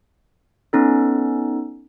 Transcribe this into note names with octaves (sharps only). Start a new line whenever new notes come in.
B3 C#4 D#4 A4